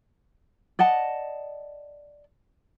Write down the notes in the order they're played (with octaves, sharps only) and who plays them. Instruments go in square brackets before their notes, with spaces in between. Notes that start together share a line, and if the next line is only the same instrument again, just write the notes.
[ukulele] D5 D#5 F#5 A5